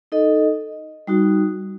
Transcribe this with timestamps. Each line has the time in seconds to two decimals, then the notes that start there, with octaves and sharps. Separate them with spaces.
0.12 D#4 A4 D#5
1.07 G3 D#4 F#4